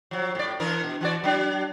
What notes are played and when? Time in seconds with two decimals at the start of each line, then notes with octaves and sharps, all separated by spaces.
0.11 F3 F#3
0.35 A2 D5
0.60 E3 D4 A#4
0.84 B2
1.01 E3 F#4 D5
1.24 F#3 D4